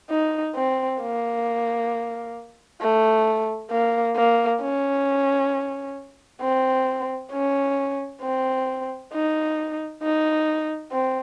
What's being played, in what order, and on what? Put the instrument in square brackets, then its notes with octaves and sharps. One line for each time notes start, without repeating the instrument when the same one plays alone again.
[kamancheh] D#4
C4
A#3
A3
A#3
A#3
C#4
C4
C#4
C4
D#4
D#4
C4